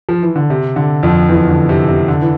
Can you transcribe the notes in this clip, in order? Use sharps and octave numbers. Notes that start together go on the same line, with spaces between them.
F3
E3
D3
C3
D3
F2 F3
E2 E3
D3
C3
C3
D3
E3